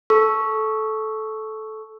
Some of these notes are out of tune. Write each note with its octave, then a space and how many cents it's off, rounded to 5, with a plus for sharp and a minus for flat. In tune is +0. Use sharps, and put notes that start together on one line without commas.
A4 -15 C#6 +0 E6 +0